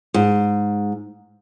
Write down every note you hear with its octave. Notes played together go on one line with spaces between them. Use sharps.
G#2